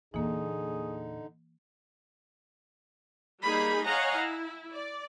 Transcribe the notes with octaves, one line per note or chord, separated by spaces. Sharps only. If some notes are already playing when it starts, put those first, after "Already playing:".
E2 A#2 D3 E3 A#3 D#4 G#4
G3 A#3 D#4 G#4 B5
C#5 D#5 F5 F#5 G#5 A#5
E4
D5